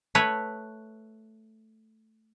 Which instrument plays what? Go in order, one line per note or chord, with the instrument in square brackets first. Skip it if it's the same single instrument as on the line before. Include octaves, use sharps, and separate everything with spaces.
[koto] A3 B4 C#5